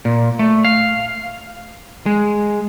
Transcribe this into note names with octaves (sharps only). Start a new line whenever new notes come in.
A#2
A3
F5
G#3